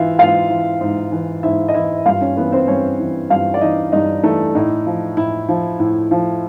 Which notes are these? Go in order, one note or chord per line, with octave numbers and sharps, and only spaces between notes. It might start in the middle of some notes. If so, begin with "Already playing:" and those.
Already playing: G#2 E3 F4 E5 F5
G#2 F4 F5
E3
G#2
E3
G#2 E4 E5
D#5
E3 E4 E5
E5
G2 F4 F5
C#4 C#5
E3 B3 B4
C4 C5
G2 C#4 C#5
E3
G2 F4 F5
D5
E3 D#4 D#5
G2 D#4 D#5
E3 A3 A4
A2 D#4
F3
A2 E4
F3
A2
F3